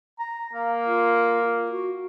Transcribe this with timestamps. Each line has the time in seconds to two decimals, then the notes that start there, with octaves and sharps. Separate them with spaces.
0.19 A#5
0.53 A#3 F5
0.85 F4
1.70 F#4